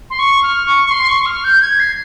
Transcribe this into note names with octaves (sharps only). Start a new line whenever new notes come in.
C6
C#6
F6
C#6
C#6
C6
C#6
F6
G6
G#6
C7